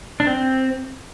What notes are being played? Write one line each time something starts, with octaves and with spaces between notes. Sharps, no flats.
D4
C4